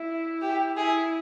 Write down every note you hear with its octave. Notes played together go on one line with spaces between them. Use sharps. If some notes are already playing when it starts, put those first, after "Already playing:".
Already playing: E4
G4
E4 G#4